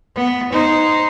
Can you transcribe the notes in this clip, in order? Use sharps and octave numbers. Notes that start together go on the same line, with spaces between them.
B3
D#4 C5